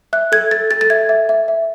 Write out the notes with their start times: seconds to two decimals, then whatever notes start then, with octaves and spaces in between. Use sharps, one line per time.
0.13 E5 F#6
0.32 A4 G#6
0.51 A4 A6
0.71 A4 A6
0.81 A6
0.90 E5 G#6
1.09 E5
1.29 E5
1.48 E5